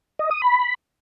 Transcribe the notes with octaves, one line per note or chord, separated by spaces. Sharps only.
D#5
D#6
B5